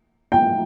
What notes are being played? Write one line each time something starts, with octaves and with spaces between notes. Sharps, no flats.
G5